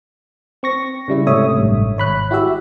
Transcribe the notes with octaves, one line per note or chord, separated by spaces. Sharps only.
C4 C#6 A#6
C#3 G3 E4
G#2 C3 A3 C#5 E5 D#6
A1 G2
G#1 C#5 B5 F#6
E4 F#4 G4 E5